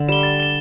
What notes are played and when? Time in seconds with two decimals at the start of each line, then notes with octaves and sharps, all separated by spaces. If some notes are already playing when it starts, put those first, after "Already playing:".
Already playing: D3
0.08 G3 E7 G7
0.23 A6
0.40 E7 G7